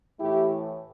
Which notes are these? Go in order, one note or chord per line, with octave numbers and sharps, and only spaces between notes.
A2 E3 A3 E4 G4